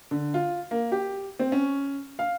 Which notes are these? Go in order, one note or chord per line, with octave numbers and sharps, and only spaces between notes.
D3
F4
A#3
G4
C4
C#4
F5